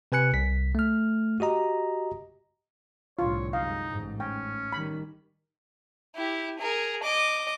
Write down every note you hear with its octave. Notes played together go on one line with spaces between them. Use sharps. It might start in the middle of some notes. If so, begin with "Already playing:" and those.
C3 B4 G#5 F#6 C#7
C2 B6
A3 F6
F#4 G4 D#5 A#5
C2 A2 D3 F4 C#5
F#2 G#3 D#4 F5
A1 G#2
C#4 G5
D#3 G3 B5
E4 G4
G#4 A#4
D#5 D6